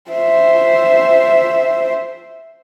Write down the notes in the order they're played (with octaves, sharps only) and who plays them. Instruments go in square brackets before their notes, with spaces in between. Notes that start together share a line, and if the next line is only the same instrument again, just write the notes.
[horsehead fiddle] C5 E5